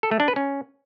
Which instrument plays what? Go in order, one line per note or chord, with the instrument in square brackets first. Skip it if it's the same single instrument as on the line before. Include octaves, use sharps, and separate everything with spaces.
[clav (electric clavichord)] A4
A3
D4
B4
C#4